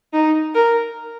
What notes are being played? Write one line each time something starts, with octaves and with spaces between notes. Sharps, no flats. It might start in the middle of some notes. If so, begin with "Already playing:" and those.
D#4
A#4